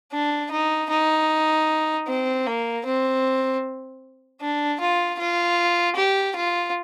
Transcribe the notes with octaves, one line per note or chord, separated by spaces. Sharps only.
D4
D#4
D#4
C4
A#3
C4
D4
F4
F4
G4
F4